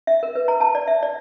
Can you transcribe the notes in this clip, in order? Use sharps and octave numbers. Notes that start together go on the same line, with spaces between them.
E5
A#4
B4
A#5
A5
D5
E5
D5